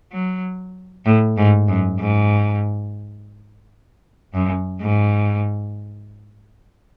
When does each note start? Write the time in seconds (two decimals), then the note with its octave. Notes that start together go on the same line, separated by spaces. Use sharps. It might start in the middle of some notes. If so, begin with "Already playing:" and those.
0.13 F#3
1.06 A2
1.37 G#2
1.69 F#2
2.00 G#2
4.34 F#2
4.81 G#2